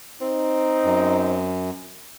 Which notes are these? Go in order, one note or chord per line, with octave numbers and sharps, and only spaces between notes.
C4 D#4
F#2